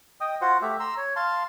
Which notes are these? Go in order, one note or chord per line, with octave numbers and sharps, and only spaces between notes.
D#5 G5 D#6
F4 F#4 C5 F#5
A3 G4 E5
A#5 C6 E6
C#5
F5 A5 C6